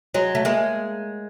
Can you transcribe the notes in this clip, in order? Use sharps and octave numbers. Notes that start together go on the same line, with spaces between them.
F#3 G#3
A3
G#3 A#3